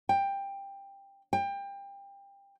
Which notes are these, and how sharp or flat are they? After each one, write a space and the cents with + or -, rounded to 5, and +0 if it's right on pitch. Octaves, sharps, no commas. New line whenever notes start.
G5 +15
G5 +25